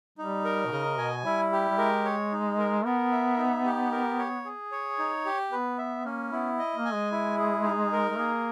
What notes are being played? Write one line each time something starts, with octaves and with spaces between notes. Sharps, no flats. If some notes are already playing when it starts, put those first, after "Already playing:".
G3 D#4
A#4
B2
C#3 D#5
B2 G#5
G3 E4
G4
G3
G#3 A#4
C#5
D#4
A#4
B3 A#4
E5
D#4
G4
A#4
C#5
G#4
C#5
D#4
G4
B3 B4
E5
A#3 C#4
B3 E4
D#5
A#3
G#5
G#3
E4
G#4
D#4
A#4
G#3
A#3 G#4